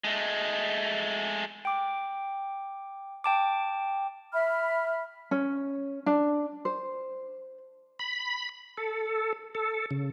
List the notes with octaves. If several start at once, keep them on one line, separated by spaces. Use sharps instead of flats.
G#3 A3
G5 D6
G5 A5 D6
E5 B5 F6
C#4
D4
C5
B5
A4
A4
C#3